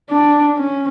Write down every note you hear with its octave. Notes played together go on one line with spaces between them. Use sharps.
D4
C#4